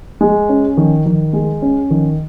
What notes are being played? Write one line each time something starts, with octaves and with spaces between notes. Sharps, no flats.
G#3
C#4
D#3
D#3
G#3
C#4
D#3